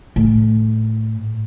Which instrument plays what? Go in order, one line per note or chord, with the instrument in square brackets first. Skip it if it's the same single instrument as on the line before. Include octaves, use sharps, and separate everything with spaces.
[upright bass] A2